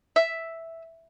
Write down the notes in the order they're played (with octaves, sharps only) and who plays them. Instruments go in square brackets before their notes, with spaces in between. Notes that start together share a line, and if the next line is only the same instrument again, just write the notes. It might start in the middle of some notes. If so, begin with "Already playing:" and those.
[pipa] E5